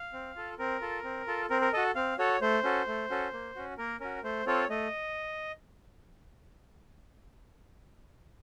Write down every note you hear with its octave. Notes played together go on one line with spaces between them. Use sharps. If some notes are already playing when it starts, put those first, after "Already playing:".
Already playing: F5
C4
F4 A4
C4 A#4
F4 A4
C4
F4 A4
C4 A#4
A#4
F#4 A4 D#5
C4 F5
F#4 A4 C#5
A3 C5
C#4 F#4 A4
A3
C#4 F#4 A4
A#3
C#4 F#4
A#3 A#4
C#4 F#4 A#4
A3 C5
C4 F4 A4 C#5
A3 D#5